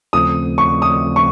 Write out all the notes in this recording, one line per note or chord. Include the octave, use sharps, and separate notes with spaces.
D#2 C#3 F3 A3 C4 D#6
C#6
D#6
C#6